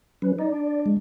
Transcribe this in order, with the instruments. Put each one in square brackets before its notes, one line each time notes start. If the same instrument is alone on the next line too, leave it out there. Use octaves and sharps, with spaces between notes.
[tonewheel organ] F#3 C#4 B4
[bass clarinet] D#4 [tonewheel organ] D5
[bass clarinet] D4
[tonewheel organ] G#3